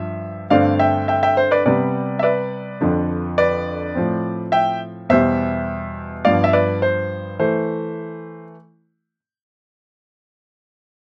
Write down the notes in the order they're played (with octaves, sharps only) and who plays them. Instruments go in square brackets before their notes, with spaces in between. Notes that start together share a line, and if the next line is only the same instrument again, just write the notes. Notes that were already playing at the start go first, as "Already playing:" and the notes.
Already playing: [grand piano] G2 F3 E5
G2 D3 A3 C4 D5 F5
E5 G5
E5 G5
E5 G5
C5
B4 D5
C3 G3 B3 B4 D5
E5
B4 D5
F2 D3 F3
B4 D5
A2 F3 C4
E5 G5
E2 B2 G3 C5 E5
G2 F3 B3 D5 F5
E5
B4 D5
C5
E3 A3 C5